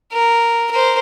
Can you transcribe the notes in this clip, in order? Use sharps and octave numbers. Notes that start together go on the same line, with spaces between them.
A#4
A#4 C5